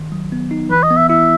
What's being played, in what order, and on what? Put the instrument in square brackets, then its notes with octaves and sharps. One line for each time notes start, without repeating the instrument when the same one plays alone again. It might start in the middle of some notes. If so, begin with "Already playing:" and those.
Already playing: [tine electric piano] D#3
F#3
B3
D#4
[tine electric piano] E3 [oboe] B4
[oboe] D#5
[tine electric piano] B3
[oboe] E5
[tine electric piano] E4 [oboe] E5